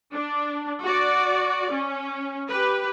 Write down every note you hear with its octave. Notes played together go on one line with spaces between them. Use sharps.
D4
F#4 D5
C#4
G4 B4